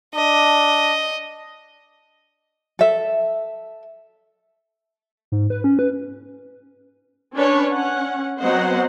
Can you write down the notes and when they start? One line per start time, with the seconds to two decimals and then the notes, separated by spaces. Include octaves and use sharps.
0.15 D4 D#5
2.79 A4 E5
5.32 G#2
5.50 B4
5.64 C#4
5.79 B4
7.37 C#4 D4 B4 C#5
7.71 C#4 F#5
8.41 F#3 B3 C4 C5 D#5 F#5